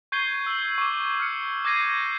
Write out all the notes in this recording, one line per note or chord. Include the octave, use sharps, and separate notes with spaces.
C#6 G6 G#6 C7 D#7 G7
E6 G7
C#6 D6
F6 C#7
D6 G6 G#6 A#6 C7 D#7